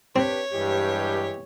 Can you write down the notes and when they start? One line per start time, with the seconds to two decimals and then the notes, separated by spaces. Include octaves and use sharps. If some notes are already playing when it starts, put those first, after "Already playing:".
0.16 C4 D4 G4 B4 C#5
0.52 G2 E3 G#3 G4